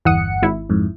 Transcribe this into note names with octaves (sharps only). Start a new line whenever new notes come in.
G1 E2 F#5 D#6 C#7
G#1 E4
F2 G#2